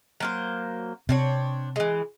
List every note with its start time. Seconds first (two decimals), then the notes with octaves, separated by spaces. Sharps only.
0.20 F#3 A#3 C5
1.09 C3 C4 D4 C#5
1.76 E3 G#3